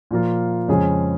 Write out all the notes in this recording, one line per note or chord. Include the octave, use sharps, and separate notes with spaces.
A#2 F3 A#3 F4
F2 C#3 G#3 C#4 G#4